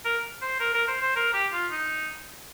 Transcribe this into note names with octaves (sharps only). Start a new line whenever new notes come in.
A#4
C5
A#4
A#4
C5
C5
A#4
G4
F4
D#4